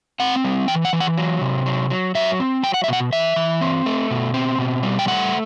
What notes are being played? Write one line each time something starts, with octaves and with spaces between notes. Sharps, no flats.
C4 F#5
G3
E3 G5
F#5
E3
F#5
F#3
C3
F#3
F#3
F#3 E5
C4
F#3 G5
F#5
E5
B2 F#5
E3 E5
E3
C4
A3
B2
C4
B2
G3
G5
A3 F#5